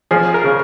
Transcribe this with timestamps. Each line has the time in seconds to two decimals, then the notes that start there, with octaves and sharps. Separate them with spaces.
0.11 F3 G#4
0.34 A#4
0.44 C#3